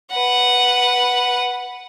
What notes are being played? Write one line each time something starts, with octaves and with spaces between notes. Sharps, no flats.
B4 F#5